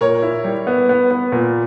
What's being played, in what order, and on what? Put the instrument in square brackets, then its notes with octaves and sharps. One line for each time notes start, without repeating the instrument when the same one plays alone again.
[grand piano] A#2 [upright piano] A#4 C#5
[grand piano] E4
G3
B3
B3
B3
A#2